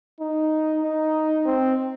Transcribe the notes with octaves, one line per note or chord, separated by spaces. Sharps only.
D#4
D#4
C4